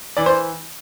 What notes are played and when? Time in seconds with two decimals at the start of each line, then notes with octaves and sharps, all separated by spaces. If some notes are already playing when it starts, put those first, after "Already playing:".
0.17 E3 D5
0.26 C5